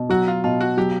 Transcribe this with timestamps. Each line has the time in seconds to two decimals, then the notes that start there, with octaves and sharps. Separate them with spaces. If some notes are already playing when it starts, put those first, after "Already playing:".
Already playing: B2
0.09 F#3 F#4
0.27 F4
0.44 B2 F4
0.61 F#4
0.77 F#3 G4